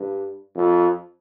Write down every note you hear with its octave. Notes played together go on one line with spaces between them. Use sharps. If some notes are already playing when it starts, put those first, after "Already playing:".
Already playing: G2
F2